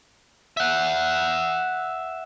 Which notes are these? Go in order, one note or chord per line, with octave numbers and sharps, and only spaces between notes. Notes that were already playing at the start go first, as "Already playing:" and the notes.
E5 F#5